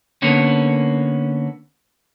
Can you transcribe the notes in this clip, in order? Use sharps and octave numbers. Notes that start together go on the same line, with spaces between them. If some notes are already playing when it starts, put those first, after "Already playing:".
D3 A#3 B3 C#4